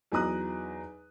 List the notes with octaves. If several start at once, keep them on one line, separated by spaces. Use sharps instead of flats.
E2 F#3 D#4 A#5 D#6 F#6